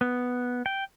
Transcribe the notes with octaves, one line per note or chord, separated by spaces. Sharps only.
B3
G5